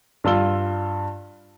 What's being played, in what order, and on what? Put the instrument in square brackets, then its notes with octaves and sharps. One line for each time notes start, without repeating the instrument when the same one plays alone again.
[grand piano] G2 F4 E6 G7